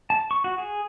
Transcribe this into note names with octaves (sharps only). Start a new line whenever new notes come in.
A5
C#6
F#4
G#4